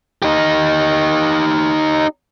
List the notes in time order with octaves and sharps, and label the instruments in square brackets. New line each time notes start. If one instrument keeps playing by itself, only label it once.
[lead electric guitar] D#4 G4